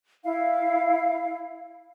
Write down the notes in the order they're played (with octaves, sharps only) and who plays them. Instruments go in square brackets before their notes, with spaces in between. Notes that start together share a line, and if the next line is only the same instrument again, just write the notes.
[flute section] E4 F5